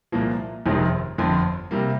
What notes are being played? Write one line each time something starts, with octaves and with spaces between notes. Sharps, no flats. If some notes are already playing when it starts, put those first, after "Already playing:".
C2 A#2 F3 A#3
G1 F2 C3 D#3 G#3
G1 F2 D3
C3 G3 A#3